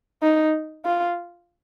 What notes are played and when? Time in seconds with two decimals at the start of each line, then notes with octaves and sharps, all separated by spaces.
0.22 D#4
0.85 F4